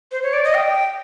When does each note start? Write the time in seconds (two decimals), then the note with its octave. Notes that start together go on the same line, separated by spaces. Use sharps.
0.12 C5
0.23 C#5
0.33 D5
0.45 D#5
0.54 G5